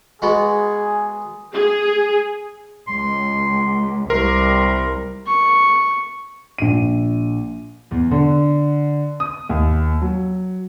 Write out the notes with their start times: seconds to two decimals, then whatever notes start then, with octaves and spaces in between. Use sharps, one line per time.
0.22 G#3 B3 F#4 G#4
1.53 G#4
2.87 C#2 C6
4.10 C2 A#4 C6
5.27 C#6
6.58 A#1 D#7
7.91 E2
8.11 D3
9.20 D#6
9.49 D#2
10.02 F#3